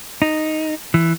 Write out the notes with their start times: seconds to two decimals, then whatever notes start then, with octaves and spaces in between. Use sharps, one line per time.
0.22 D#4
0.94 E3